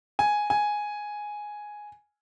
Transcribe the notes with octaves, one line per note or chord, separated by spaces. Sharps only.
G#5
G#5